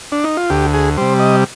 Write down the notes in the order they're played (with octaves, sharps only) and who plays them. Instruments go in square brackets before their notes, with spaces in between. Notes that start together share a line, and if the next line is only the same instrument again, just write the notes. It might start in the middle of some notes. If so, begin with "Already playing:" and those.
[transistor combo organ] D4
D#4
F4
D2 G4
G#4
C3 G3 C5
D#5